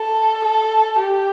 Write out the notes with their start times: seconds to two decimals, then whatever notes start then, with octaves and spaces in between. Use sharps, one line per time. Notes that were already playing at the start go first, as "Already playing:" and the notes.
Already playing: A4
0.45 A4
0.99 G4